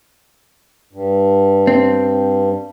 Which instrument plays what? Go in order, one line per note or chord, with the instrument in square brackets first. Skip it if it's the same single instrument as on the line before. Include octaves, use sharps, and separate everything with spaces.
[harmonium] G2
[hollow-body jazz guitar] C4